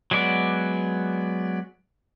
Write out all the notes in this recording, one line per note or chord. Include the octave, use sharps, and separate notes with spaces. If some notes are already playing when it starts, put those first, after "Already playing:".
F#3 G#3 B3 D5